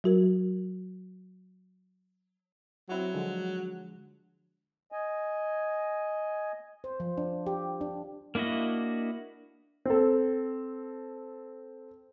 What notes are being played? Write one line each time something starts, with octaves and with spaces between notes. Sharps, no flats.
F#3 F#4 A#4
F#3 C4 E4 F#4
D3 F3 G#3
D#5 G#5
C5
F3
D4
G4
D4
A#3 D4 E4 F#4 D#5
C4 A4